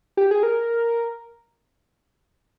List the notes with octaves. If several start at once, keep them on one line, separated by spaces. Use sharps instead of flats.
G4
G#4
A#4